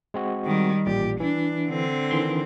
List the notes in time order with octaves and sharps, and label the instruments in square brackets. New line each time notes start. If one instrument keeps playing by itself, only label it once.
[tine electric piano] G#3 C4 F#4
[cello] D#3 G3
[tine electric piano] A1 A#2 D5 [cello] G4
[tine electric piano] E3 [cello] D4
[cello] D3 C4
[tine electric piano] D#3 E3 C6